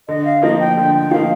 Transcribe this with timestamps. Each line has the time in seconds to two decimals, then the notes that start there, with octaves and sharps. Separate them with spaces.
0.08 D3 D#5
0.25 F5
0.42 F3 A#3 D#4 D#5
0.60 G5
0.77 D3 G5
0.94 G5
1.11 F3 A#3 D#4 F5